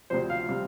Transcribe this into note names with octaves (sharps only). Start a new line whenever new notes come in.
D2 C3 F3 C5
F5
C3 G3